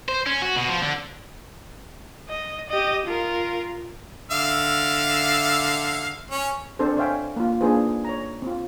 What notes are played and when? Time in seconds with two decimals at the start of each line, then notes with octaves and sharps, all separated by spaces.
0.08 C5
0.26 C#4
0.42 F#4
0.56 B2
0.68 F3
0.82 D3
2.29 D#5
2.70 G4 D#5
3.06 F4 A#4
4.31 D3 E5 F5
6.31 C#4
6.79 C4 D4 A4 A#4 C5
6.97 C5 C#5 E5 F5 G5 G#5
7.36 A#3 F4
7.61 A#3 D4 D#4 G#4 B4 C5
8.05 C#5 A#5
8.42 C4 F4